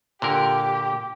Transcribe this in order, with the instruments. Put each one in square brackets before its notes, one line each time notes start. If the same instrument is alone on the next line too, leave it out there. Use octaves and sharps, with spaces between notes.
[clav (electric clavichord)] A#2 D3 A#4 [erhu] G4